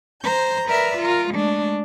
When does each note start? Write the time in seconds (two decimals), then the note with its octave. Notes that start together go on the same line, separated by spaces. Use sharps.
0.22 C5 A#5 G6
0.67 A#4 B4 D5 E5
0.99 F4 A#4
1.31 G#3 A3 D4